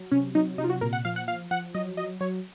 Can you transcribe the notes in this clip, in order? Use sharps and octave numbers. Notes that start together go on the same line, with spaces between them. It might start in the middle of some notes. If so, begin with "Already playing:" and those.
Already playing: F#3
C3 C#4
F#3 D#4
C3 D#4
F4
F#4
A#2 A#4
F#5
F3 F5
F#5
F3 F5
F3 F#5
F#3 D#5
F#3 D#5
F#3 C#5